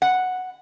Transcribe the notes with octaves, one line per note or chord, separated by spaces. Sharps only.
F#5